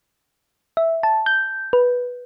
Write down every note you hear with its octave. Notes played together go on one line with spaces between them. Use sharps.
E5
A5
G6
B4